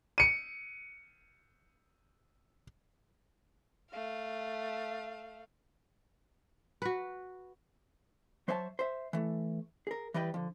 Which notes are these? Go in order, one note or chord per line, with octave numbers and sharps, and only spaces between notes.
C#7 D#7
A3 F5
F#4 B4
F#3 C5 C#5 E5 G5 A5
C5 E5
E3 A3
G#4 A#4
E3 G3 B4 D#5 G5
D3 F3